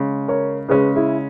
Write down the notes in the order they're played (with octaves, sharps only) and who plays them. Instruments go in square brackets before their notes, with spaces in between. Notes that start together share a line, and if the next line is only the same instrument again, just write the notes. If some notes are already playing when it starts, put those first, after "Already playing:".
Already playing: [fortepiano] C#3 G#3 C#4
[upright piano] A#4 C#5
[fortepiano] C#3 G#3 C#4 [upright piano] G#4 B4
[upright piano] E4 G#4